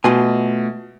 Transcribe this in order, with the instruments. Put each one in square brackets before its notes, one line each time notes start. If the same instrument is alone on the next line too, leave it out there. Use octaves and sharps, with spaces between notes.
[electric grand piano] B2 [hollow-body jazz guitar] A3 F4 G#5